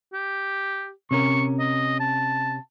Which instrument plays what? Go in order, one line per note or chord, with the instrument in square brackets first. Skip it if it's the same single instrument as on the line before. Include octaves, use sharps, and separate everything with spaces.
[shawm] G4
[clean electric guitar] C3 C#4 A#4 [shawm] C#6
[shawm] D#5
A5